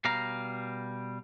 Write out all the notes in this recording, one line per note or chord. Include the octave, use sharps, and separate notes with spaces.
B2 G3 F5 A#5